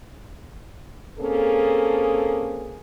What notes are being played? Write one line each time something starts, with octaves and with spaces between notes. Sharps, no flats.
A#3 C4 C#4 G#4 A4